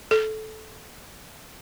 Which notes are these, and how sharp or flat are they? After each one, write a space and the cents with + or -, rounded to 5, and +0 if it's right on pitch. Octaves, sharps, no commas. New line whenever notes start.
A4 -15